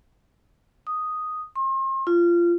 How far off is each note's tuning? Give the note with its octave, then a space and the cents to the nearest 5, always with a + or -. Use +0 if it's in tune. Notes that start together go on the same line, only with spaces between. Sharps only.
D#6 +0
C6 +40
F4 -20